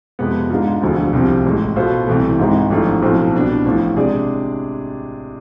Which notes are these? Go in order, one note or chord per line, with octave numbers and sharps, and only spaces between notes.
F2 C3 G#3 B3
G#2 G#3 D4 F4
E1 D2 D3 F3
C2 C3 F3
A1 A2 G#3
B2 B3 F4 A4 C5
C2 C3 E3 A3
G#1 G#2 G#3 C4 E4
A1 G#2 F3 A3 D4
B1 A2 F3 A3 C4
C2 B2 B3 D4
A1 A2 F3
C3 G#3 D4 G#4 D5